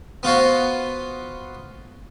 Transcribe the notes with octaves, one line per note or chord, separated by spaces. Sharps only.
B3 F4 F#4 C5